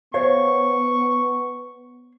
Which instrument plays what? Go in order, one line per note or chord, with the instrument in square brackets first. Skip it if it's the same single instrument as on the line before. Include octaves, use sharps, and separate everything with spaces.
[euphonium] B3 [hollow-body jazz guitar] C5 C#5 F5 [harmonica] C#6